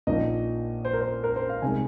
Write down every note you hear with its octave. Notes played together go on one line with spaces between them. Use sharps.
A#1 A#2 F3 A#3 D#4 D#5
C5
A#4
C5
A#4
C5
F5
C2 C3 G#3 C4 D#4 G#5